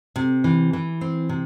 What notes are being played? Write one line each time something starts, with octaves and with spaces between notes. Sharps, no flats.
C3
E3
E3
C4
C3